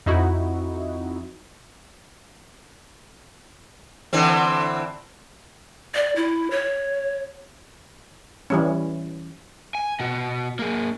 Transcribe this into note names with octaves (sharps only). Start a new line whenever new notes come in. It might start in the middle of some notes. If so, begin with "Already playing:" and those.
F2 D#4 E4 F#4
D3 E3 C4
D5
E4
C#5
E3 G3 C#4
G#5
B2 F#4
A#3 G#4